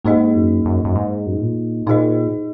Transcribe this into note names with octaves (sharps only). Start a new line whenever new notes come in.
G#2 A#3 D#4 G#4 D#5
F#2
F#2
F#2
G#2
F#2
G#2
A#2
A#2 D#4 G#4 D#5